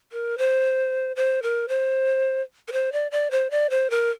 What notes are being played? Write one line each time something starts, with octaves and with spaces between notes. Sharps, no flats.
A#4
C5
C5
A#4
C5
A#4
C5
D5
D5
C5
D5
C5
A#4